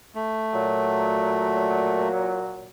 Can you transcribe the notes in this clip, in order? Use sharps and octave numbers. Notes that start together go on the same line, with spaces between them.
A3
A#2 F#3